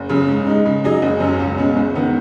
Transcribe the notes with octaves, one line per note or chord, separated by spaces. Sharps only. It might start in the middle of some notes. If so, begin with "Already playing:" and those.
Already playing: F#1
F#2 C#3
G#2
G#3 D#4
C#3
F#3 D#4 G#4 D#5
F#1
F#2 F#3 C#4
C#2
B2 G#3 C#4
F#1
D#3 B3